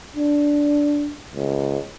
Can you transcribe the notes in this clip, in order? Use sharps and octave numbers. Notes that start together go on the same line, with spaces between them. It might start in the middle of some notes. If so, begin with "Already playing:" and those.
D4
C#2